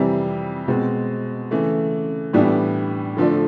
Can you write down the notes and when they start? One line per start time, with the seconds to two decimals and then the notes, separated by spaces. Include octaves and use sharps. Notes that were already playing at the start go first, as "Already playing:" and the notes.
Already playing: F2 C3 E3 G3
0.68 B2 G#3 C4
1.51 C#3 E3 A3
2.33 A2 E3 G3 B3 D4
3.17 D3 F3 A3 D4